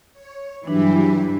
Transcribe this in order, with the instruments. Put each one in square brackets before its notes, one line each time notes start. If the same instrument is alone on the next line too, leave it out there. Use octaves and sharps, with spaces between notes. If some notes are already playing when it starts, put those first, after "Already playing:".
[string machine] C#5
[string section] G2 E3 [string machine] F#3 E4 G4 [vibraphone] D4